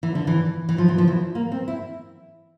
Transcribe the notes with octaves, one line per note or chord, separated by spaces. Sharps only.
E3
D3
E3
E3
F3
E3
F3
E3
A#3
C4
E4